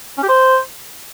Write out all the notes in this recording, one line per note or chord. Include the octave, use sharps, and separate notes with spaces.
C#4
G4
C5